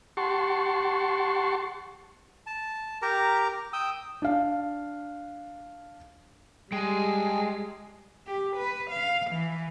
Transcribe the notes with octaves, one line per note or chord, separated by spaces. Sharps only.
G4 F#5 A5 C6 C#6
A5
G4 A#4 A#5
G5 D#6 E6
D4 F5
G3 G#3 G5 G#5
G4
B4
F5
E3